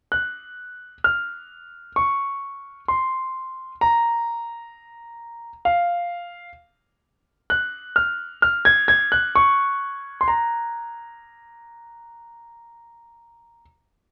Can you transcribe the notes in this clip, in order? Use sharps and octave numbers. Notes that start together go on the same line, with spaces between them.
F#6
F6
C#6
C6
A#5
F5
F#6
F6
F6
G#6
G#6
F#6
C#6
C6
A#5